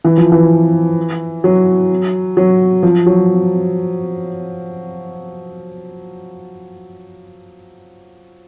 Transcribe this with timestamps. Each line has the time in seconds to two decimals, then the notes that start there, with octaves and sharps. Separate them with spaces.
0.04 E3
0.18 F3
0.32 E3
1.44 F#3
2.37 F#3
2.83 F3
3.06 F#3